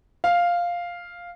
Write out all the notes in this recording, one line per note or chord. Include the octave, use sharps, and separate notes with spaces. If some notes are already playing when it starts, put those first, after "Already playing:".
F5